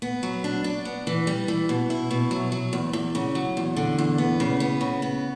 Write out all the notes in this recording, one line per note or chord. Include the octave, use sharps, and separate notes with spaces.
B3
F#3
D4
D4
B3
E3
G3
E3
B2
E4
B2
F#3
F#3
E2
E2
C#3
F#3
E2
D3
E2
B3
C#3
B3
C#3
B3